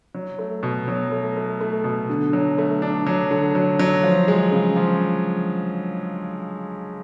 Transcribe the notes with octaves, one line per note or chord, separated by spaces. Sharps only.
F#3
A3
B2
F#3
A3
A3
A3
B2
D3
F#3
A3
D4
F#3
D3
F#3
F#3
F3
G#3
C#3
F3